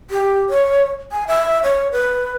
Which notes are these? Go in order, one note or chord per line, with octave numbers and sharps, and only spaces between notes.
G4
C#5
G#5
E5
C#5
B4